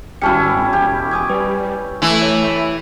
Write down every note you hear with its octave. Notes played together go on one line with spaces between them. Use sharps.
G#1 G3 C#4 E4 F#4 A5 C#7
E1 G4
G#5 D#6 G#6
G3 B4
E3 A3 E4
C#5